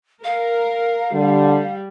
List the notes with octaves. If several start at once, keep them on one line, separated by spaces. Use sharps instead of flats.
A#4 F5
D3 G3